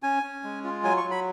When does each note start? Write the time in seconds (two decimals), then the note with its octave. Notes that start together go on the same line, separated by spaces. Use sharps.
0.03 C#4 G#5
0.23 C#4
0.44 G#3
0.64 F4
0.84 F#3 G#5
0.97 C#6
1.04 F#3
1.11 B5